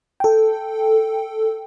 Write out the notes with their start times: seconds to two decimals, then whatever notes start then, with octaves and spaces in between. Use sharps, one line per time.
0.20 A4 G5